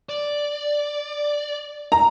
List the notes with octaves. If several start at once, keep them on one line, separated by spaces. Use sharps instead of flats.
D5
A#5